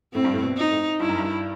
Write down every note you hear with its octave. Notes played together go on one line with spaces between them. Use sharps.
A2 C4
G2
A2
B2
D#4
A2
G2 E4
F#2
G2